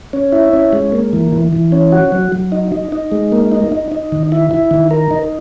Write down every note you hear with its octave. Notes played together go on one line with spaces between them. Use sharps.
C#4
E4
C#4
G#3
A#3
E3
E3
E3
C#4
F#4
F#3
F#3
D#4
D#4
D#4
G#3
A#3
D#4
D#4
D#4
D#3
E4
E4
D#3
A#4
D#4